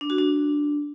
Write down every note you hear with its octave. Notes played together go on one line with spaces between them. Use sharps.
D4
F#4
D4